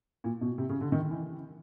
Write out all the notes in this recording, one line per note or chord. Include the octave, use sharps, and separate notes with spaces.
A#2
B2
C3
C#3
D3
D#3
E3